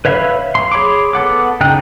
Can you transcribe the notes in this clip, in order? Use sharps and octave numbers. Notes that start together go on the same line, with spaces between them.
B4 C#5 E5 F5 B5
C6
G#4 C#5 B5 C6 D6
B3 A4 F#5 D6
C#3 D#4 G5 F#6